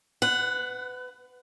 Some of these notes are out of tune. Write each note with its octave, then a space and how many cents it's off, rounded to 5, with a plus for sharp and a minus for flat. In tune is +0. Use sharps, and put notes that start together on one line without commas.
B4 +30 F#5 +0